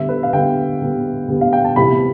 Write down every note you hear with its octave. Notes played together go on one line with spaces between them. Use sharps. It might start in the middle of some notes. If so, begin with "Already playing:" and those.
Already playing: D3 G3 B3 E5
B4
F5
D3 G3 B3 G5
D3 G3 B3
D3 G3 B3
F5
G5
A5
C3 E3 G3 B3 B5